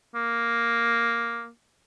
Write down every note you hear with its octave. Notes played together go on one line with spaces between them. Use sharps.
A#3